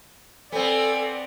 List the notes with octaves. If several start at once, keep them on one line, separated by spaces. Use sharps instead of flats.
B3 C4 A4 D5 G#5